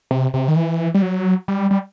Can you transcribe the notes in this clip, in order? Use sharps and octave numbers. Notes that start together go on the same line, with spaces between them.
C3
C3
D#3
E3
G3
F#3
G3
G3